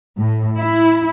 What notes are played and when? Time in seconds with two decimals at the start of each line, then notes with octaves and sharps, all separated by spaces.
0.18 A2
0.57 E4